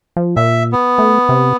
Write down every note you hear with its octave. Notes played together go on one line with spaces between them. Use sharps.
F3
A#2 E5
B3
A3
C3